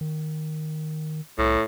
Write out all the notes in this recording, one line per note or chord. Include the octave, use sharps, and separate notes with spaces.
D#3
C2 A2